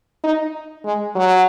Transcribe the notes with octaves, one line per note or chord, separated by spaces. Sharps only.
D#4
G#3
F#3